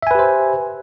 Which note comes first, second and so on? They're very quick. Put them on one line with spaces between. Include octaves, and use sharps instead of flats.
E5 G#5 B4 G4 C5